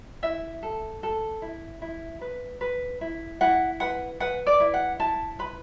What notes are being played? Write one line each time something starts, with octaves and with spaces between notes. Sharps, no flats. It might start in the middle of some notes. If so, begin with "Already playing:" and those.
E4 E5
A4
A4
E4
E4
B4
B4
E4
E4 F#5
B4 F#5
B4 F#5
D5
E4
F#5
E4 A5
B4 B5